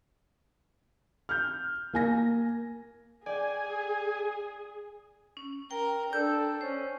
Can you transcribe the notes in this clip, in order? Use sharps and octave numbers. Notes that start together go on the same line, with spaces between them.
F6 G6
A#3 G#5 A#6
G#4 D5 G5 G#5
C#4
A#4 G5
D4 A4 G6
C#4 C5